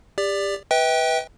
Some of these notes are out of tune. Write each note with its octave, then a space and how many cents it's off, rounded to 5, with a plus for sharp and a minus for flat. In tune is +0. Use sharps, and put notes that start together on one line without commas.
G4 +30 D5 -5
B4 +0 E5 -40 G5 +0